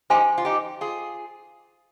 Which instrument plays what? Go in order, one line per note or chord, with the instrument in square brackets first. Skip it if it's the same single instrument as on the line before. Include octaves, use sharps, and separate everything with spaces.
[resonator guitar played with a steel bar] D#4 G4 [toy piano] C5 F5 G#5 C6
[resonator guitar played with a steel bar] F4
D#4 G4
F4 G#4